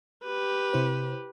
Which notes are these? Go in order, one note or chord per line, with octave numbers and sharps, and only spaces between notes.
G4 B4
C3 E4 C5